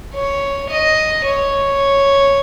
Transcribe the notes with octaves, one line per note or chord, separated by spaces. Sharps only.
C#5
D#5
C#5